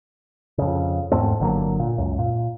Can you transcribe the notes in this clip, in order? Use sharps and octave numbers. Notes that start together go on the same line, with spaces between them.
F2 C#3
E2 G#2 A3 C4
G1 D3 F#3 A#3
A#2
C#2 F#2
A#2